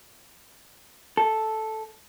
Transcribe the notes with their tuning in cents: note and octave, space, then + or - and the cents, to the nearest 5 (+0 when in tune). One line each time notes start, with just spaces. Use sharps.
A4 -5